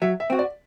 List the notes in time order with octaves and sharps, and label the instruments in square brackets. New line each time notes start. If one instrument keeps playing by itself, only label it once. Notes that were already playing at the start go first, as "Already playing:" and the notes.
[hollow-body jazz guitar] F#3 [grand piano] E5
[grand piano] E5
[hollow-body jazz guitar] C4 F#4
[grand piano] D5